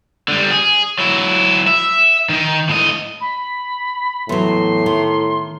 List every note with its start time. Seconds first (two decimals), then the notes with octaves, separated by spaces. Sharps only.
0.28 D3 G3
0.51 G#4
0.99 F#3 E4
1.67 E5
2.29 D#3 D#4
2.69 A2 D#5
3.21 B5
4.29 E2 A2 F#3 C6
4.86 D#3